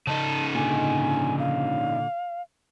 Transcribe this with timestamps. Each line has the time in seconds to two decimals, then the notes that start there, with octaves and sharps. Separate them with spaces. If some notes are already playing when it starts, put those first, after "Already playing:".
0.07 C#3 D#4 A5
0.55 A#2 D3 G#5
1.39 F5